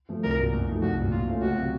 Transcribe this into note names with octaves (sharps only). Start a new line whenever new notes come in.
F3 A3
C2 A#4
A#2 F#3
F#2
F3 A3 D#4
C2 F#4
A#2 F#3
A#2 F4
A3 C#4 F4
C#2 F#4
C3 F#3